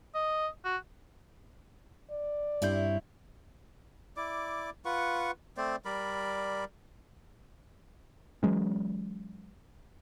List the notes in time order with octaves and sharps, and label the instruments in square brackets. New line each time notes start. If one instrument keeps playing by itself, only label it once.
[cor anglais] D#5
F#4
[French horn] D5
[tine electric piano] G2 G3 G6 [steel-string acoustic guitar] C4 E4 C#5
[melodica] E4 D5 D6
F4 B4 F#5 C#6
A3 C4 C5 D5
G3 A#4 D5 B5
[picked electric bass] E3 F#3 G#3 C#4